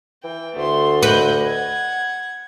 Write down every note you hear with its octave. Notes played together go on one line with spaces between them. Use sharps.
E3 G5
D2 A3 C6
B4 D#5 G6
F#5 G#6